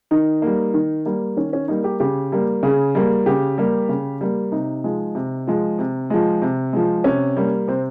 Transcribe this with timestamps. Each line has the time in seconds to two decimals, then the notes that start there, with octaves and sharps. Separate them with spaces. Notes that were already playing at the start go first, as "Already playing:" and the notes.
0.11 D#3 D#4
0.42 G3 A#3
0.74 D#3
1.06 G3 A#3
1.37 D#3 C#4
1.53 C#4
1.68 G3 A#3 D#4
1.84 G4
2.00 C#3 G4
2.32 G3 A#3
2.63 C#3 G#4
2.95 G3 A#3
3.26 C#3 G4
3.58 G3 A#3
3.89 C#3
4.21 G3 A#3
4.52 C3 D#4
4.84 F3 G#3
5.15 C3
5.47 F3 G#3
5.79 C3
6.10 F3 G#3
6.42 C3
6.73 F3 G#3
7.04 C3 C#4
7.37 G3 A#3
7.68 C3 C4